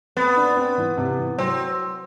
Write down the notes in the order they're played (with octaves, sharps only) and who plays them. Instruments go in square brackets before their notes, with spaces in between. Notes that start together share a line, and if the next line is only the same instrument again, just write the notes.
[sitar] B3 [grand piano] C4
[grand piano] D4
D4
C4
E3
C3
E3
[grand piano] F#3 [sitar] C4